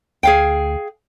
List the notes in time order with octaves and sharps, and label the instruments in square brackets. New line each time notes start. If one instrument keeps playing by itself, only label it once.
[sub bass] D2 [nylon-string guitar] G#4 F5 G5